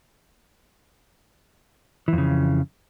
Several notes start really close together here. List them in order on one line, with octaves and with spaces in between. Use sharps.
E3 F2 C#3